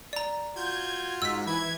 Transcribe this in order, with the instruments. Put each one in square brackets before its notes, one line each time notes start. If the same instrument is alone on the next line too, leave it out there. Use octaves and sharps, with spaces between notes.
[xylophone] D5 A#5
[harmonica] F4 F#4 [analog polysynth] G6 G#6
[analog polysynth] G#2 [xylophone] E6 B6
[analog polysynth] E3 G#6 [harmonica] B4